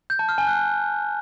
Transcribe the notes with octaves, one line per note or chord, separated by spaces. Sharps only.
G6
A5
F6
G#5
F#6